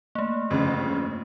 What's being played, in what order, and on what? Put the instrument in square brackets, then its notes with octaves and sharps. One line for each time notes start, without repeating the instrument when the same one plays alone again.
[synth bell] A3 A#3
[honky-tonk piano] G1 F2 C#3